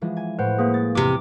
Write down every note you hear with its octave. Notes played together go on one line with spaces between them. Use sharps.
E3 F3 G#3
G#5
A2 B4 C5 F#5
A#3 G#4 B4
A6
E2 C3 D6